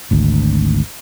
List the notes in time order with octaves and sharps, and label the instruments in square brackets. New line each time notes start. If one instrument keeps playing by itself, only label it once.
[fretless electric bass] G#1 D2